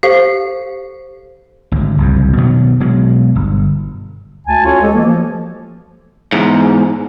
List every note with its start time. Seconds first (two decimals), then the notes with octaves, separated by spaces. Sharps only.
0.03 G4 A4 C5 F5
1.72 G#1 D2
1.98 F#1 C2 F2
2.37 B2 D#3 F#3
2.80 B2 F#3 G#3
3.36 G1
4.48 D2 G#5 A5
4.65 C#4 F4 F#4 A4 C#5
4.82 G#3 A3 G4 A4
4.94 E3 A#3
5.06 F3
6.32 E2 G#2